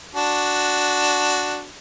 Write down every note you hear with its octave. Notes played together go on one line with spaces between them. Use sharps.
D4 F#4